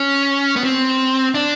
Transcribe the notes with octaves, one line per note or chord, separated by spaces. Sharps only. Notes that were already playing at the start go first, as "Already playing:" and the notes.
Already playing: C#4
B3
C4
D4